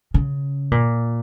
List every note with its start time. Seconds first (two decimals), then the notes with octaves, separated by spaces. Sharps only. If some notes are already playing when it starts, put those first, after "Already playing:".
0.14 C#3
0.71 A#2